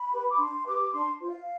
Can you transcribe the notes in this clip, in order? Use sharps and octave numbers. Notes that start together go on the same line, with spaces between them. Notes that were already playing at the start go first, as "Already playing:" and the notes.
Already playing: B5
G4 B4
D6
D4 C6
G4 B4 D6
D4 C6
F4 C5
F5